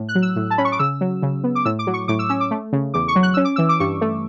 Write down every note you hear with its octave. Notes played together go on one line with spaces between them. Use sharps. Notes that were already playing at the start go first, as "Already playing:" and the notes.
Already playing: A2
F#6
F#3
E6
A2
A5
C#4 B5
C#6
D6
C#3 E6
F#3
C#3
B3
D6
A2 E6
D6
F#3
C#6
A2 D6
E6
C#4 E6
D6
A3
C#3
E2 D6
C#6
F#3
F#6
C#4 E6
D6
E3 E6
D6
G2 C#6
A3